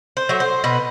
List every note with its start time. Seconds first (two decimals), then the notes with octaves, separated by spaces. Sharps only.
0.17 C5
0.29 F#3 A3
0.40 C5
0.64 B2 B4